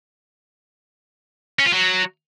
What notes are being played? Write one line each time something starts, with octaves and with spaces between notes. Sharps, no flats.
C#4
F4
F#3